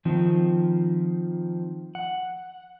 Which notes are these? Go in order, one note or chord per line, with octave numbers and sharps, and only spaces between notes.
D#3 F3 C4
F#5